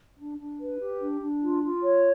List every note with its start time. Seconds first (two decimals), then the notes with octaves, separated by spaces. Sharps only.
0.16 D4
0.36 D4
0.58 B4
0.79 G4
1.00 D4
1.20 D4
1.41 F4
1.62 F4
1.82 C#5